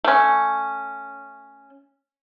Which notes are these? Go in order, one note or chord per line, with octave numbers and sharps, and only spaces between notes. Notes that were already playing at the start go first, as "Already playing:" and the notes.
A3 C#4